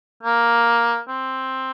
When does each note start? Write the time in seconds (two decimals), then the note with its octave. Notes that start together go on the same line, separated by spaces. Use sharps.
0.23 A#3
1.08 C4